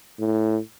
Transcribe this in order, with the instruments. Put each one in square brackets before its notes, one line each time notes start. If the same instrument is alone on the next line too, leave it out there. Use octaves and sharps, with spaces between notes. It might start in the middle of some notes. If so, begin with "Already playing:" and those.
[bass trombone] A2